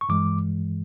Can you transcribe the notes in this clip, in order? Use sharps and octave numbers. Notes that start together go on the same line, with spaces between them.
C#6
G2 E3 G#3 D6